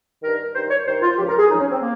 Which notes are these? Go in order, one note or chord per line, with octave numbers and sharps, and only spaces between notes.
G2 D#3 A#4
G2 D#3 C5
C#5
G2 D#3 C5
F4
C#2 C#3 F3 G4
A#4
G#4
C#2 C#3 F3 D#4
C#4
C4
A#3